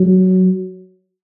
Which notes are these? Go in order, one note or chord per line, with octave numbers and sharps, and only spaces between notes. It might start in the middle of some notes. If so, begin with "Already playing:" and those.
Already playing: F#3